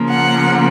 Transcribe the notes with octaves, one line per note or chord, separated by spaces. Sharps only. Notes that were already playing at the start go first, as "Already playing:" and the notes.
Already playing: C#3 F3 A#3
F#5